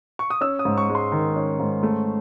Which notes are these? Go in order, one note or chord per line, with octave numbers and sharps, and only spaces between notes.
C#6
D#6
C#4 E6
D#6
G#2
C#6
G#3
C6
D#3
C#4
G#2
A3